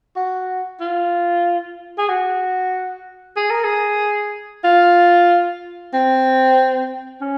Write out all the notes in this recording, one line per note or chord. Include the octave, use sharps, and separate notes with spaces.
F#4
F4
G#4
F#4
G#4
A#4
G#4
F4
C4
C#4